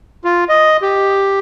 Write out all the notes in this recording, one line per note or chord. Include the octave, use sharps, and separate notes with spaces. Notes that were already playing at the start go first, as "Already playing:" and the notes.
F4
D#5
G4